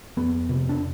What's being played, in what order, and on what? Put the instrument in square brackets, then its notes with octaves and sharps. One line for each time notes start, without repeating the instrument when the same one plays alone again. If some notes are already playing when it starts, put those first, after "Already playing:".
[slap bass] F2 B3
C3
D4